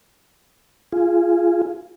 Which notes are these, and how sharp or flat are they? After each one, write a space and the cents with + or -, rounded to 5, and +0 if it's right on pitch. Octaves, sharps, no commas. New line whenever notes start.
F4 -15 G#4 +0